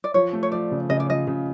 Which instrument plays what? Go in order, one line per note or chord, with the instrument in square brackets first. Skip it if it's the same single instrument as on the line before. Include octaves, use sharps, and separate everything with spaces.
[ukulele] D5
[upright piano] F3 [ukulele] C#5
[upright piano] A3
[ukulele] C#5
[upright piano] F3 [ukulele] D5
[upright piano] C#3
[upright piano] C#3 [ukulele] D#5
[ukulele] D5
[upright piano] F3 [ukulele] D#5
[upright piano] C#3